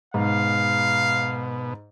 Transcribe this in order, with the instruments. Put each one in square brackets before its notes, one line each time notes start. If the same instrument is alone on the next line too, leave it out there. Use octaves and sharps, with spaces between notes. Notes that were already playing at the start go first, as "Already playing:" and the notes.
[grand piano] G#2 [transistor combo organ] B2 [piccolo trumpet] F5